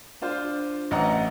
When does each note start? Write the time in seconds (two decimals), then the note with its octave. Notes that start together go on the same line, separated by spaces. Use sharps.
0.22 D4 F4 C5
0.91 A1 D#5 F#5 A#5